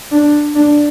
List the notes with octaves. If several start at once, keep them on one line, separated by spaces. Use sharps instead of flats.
D4
D4